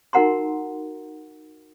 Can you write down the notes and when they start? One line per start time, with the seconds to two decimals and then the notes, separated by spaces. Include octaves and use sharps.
0.13 D#4 F#4 A#4 F#5 A#5 C6